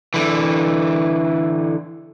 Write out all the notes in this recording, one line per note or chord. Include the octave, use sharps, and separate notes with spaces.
D3 E3